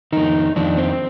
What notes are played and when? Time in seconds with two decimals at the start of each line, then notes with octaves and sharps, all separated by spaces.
0.12 F2 D#3 D#4
0.56 F2 D#3 D4
0.77 C4